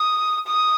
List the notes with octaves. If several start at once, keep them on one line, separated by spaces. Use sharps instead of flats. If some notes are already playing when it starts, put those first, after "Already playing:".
Already playing: D#6
D#6